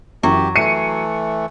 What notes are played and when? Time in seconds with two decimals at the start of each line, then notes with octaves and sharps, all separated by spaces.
0.23 F#2 E3 F#3 G4
0.56 E3 A3 C7 C#7 D#7